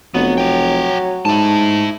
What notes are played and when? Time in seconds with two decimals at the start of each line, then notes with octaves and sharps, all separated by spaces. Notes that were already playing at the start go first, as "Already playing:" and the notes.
0.14 F1 F#3 B3
0.38 F#4 G5
1.25 G#2 E4 A5